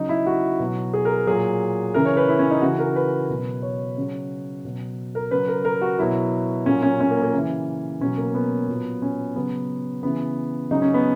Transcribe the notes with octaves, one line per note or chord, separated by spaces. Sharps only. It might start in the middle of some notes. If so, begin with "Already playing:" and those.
Already playing: C#3 F#3 D#4
E4
F#4
B2 F#3
G#4
A#4
A#2 F#3 G#4
C#3 E3 A#4
C#5
B4
E4
C#4
D#4
C#3 E3 F#4
A#4
B4
B2 F#3
C#5
C#3 F#3
B2 F#3
A#4
C#3 F#3 B4
A#4
A#4
F#4
B2 F#3 E4
A#2 F#3 C#4
C#4
C#4
A#3
A#3
C#3 E3
B2 F#3 C#4
A#3
B3
A#2 F#3
C#4
C#3 F#3 B3
C#3 E3 B3
C#3 F#3 D#4
C#4
B3